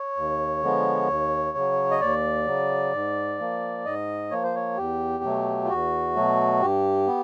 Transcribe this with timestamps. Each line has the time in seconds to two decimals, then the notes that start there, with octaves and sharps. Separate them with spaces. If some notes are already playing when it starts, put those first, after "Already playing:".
Already playing: C#5
0.16 D#2
0.62 D3 F3 G#3 B3
1.09 D#2
1.55 C#3 F#3
1.91 D#5
2.01 D#2 D5
2.47 C#3 F#3
2.93 G#2
3.39 F3 A#3
3.85 G#2 D#5
4.31 F3 A#3 C#5
4.43 C5
4.55 C#5
4.77 E2 G4
5.23 B2 F#3 A3
5.64 F4
5.69 E2 F#4
6.15 B2 F#3 A3
6.61 G2 G4
7.07 B3